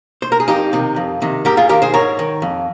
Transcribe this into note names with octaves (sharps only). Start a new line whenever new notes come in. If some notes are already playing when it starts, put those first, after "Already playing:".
C5
A#4
G#4
F2 D#4 G4
C3 D#3
F2
C3 D#3
G#2 G4 A#4
F4 G#4
D#3 G4 A#4
G#4 C5
G#2 A#4 C#5
D#3
F2